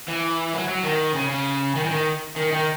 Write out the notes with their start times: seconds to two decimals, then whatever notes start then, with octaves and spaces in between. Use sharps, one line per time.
0.08 E3
0.54 F#3
0.69 F#3
0.83 D#3
1.15 C#3
1.29 C#3
1.75 D#3
1.85 E3
1.91 D#3
2.36 D#3
2.52 D#3